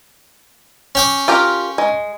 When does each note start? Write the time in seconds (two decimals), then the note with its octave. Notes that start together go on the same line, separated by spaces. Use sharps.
0.95 C#4 G5 D6
1.28 F4 G4 A#4
1.78 G#3